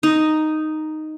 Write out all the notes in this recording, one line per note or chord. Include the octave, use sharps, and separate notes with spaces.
D#4